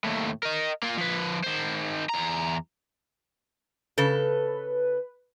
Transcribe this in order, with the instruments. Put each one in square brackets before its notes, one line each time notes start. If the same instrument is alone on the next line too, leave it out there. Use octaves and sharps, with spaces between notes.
[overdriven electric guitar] D#2 A2
A#4 D#5
A#3 F4
F3 B4
D#3 C5
E2 A#5
[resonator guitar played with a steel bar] C#3 A4 [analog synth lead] B4